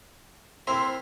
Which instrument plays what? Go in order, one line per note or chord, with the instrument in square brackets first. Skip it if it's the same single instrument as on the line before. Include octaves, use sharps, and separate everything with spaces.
[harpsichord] C4 E4 A#4 [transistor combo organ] C5